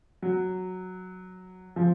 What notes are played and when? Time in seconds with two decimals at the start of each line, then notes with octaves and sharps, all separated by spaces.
0.22 F#3
1.76 F3